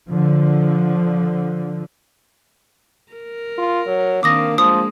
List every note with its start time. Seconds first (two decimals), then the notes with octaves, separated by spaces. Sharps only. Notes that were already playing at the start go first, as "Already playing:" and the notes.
0.10 D3 F3
3.12 A#4
3.58 F4
3.87 F#3
4.23 D#3 A#3 C4 D4 D6 D#6 A#6
4.58 F3 G#3 A#3 D#6